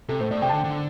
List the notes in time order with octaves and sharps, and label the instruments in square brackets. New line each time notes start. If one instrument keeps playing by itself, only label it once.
[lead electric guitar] C3 [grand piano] A4
[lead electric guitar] A2 [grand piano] C5
[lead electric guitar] A2 [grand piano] D5
[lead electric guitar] C3 [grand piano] G5
[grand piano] A5
[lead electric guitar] D3
[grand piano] G5
[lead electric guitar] D3